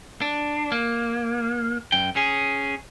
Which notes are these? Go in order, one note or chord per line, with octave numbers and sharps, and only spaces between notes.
D4
A#3
F#2 G5
C#4 G#4